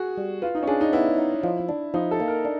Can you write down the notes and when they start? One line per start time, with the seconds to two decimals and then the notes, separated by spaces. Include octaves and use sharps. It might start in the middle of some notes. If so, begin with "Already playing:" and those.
Already playing: F#4 G#4
0.17 G3
0.42 F4 B4
0.55 D#4
0.63 C#4
0.68 D4 G#4
0.81 D#4
0.93 B3 E4
1.18 D#4
1.43 F3
1.69 D4
1.94 F3 D#4
2.11 A4
2.20 A#3
2.28 A#4
2.45 D4